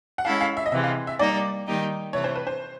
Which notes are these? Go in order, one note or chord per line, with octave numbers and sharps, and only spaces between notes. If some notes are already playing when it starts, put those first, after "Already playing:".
F#5
G#3 C#4 E4 A4 F5
F5
E5
D#5
C3 E3 G#3 E5
F5
E5
G3 A#3 D#4 D5
D#3 G3 A#3 D#4 G4
C3 E3 A3 C#5
C5
B4
C5